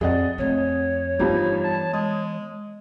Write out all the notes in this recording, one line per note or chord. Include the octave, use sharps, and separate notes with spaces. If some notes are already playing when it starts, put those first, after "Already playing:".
F2 G#4 D5 D#5 F#5
F2 A3 C#5
G2 E3 F3 G3 B3 D#4
A5
G#3 D#6